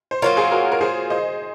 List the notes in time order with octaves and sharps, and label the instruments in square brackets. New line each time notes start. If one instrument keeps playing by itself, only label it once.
[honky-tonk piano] C5
[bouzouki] F#3 A#3 F4 [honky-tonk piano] A#4 C#5
[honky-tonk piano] G#4 C5
F#4 A#4
A#4
G#4 C5
C5 D#5